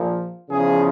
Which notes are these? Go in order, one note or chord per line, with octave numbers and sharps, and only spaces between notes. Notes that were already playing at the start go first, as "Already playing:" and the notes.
Already playing: A#1 A#2 F3
E2 C#3 F3 G#4